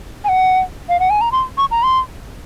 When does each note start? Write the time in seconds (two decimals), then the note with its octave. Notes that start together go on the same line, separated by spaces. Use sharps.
0.24 G#5
0.29 F#5
0.89 F5
1.00 F#5
1.10 G#5
1.21 A#5
1.32 C6
1.58 C#6
1.71 A#5
1.83 C6